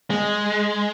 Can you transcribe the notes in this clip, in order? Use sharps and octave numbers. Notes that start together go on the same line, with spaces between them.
G#3